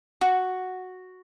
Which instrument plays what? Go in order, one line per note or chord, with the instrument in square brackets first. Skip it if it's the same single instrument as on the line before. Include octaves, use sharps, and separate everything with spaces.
[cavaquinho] F#4